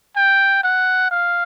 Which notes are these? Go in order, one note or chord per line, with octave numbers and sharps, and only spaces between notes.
G5
F#5
F5